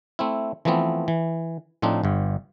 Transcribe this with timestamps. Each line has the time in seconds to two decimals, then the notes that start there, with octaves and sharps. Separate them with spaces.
0.19 A3 C4 E4
0.65 E3 F3 A3 B3 C4
1.08 E3
1.82 A2 F3 C4 D4 D#4
2.04 G1 G2